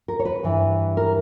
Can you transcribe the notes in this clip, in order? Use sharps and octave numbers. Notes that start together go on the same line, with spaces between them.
A#4
C#5
B4
G2 E3
A#4